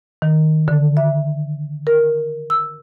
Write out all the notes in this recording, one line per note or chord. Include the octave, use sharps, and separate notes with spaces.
D#3
D3
E5
A#4
E6